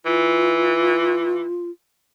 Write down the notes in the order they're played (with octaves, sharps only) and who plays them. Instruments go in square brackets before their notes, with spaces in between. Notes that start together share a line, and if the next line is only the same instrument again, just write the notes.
[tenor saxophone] E3 [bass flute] F4